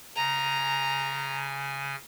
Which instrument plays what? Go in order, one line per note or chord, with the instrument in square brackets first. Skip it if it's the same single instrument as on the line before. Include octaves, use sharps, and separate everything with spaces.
[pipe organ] C#3 G#5 [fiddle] A#5